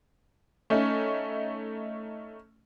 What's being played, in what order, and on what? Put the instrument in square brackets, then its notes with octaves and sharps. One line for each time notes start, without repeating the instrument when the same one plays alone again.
[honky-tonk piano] A3 C#4 D#4